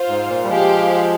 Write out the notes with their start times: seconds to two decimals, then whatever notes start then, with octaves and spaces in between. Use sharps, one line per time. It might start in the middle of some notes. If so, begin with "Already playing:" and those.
Already playing: F4 C5 F5
0.08 G#2
0.29 A#2
0.44 G3
0.48 F3 G#3 G4 C5 F5